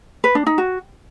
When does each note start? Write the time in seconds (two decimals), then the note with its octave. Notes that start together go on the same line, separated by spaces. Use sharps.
0.24 B4
0.35 D4
0.46 D#4
0.58 F#4